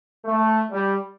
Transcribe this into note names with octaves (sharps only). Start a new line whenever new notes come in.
A3
G3